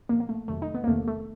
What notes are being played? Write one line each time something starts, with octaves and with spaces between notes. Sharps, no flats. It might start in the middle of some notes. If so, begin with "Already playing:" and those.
A#2 F3 A#3
A#3
A3
F2 C3 D#3 F#3 A3
D#4
B3
A#3
E2 C3 D#3 A3
A3